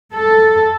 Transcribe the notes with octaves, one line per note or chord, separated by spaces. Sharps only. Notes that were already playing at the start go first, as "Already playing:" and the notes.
A4